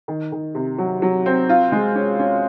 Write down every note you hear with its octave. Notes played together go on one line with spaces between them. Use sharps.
D#3
D#3
C3
F#3
F#3
C4
F4
G#3
C#4
C#4